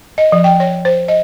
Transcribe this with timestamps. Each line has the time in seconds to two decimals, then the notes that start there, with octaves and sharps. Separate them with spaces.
0.18 D#5
0.32 F3
0.44 G5
0.60 C#5
0.85 C5
1.08 D#5